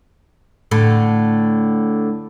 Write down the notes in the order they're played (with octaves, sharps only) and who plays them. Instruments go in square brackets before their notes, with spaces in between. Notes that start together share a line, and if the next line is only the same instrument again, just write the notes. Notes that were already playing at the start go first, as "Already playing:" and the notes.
[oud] A2 D3